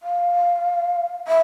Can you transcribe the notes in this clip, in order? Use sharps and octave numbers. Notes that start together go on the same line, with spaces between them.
F5
E5